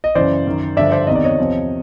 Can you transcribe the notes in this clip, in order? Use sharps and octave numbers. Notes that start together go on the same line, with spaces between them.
D#5
F#2 C#3 E3 C5 D5
F#2 D#3
G2 D3 F3 D5 E5
C5 D5
E2 C3 D#3 D#5
D5
C#5 D#5
E2 C3 F3